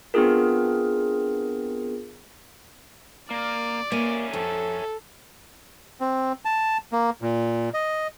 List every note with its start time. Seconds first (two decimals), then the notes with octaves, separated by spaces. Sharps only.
0.14 B3 C4 D4 F4 G#4 A#4
3.31 A#3 D5
3.92 A#3 C#5 E5 G#5
4.33 F2 A4
6.01 C4
6.45 A5
6.92 A#3
7.22 A#2
7.74 D#5